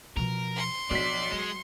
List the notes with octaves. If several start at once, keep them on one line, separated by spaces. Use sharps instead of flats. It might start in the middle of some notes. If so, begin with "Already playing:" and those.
B2 F3 A#4
C6 C#7
B1 F3 D4 D5 B6
F#3 G#3